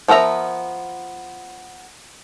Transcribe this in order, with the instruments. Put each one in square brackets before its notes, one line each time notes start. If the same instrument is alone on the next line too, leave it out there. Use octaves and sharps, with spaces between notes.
[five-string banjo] F3 B3 A#4 E5 A#5